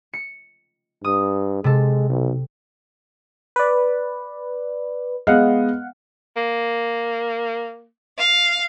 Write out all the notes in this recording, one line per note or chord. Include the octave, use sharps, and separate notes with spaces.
C#7
G2 D#6
C3 G#3 A4
B1
B4 D5
G#3 B3 D#5 F5 F#5
A#3
F5